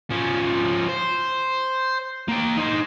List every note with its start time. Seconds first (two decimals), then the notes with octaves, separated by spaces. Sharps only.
0.10 F3 C#4
0.88 C5
2.29 A#3 G5
2.57 D#4 C5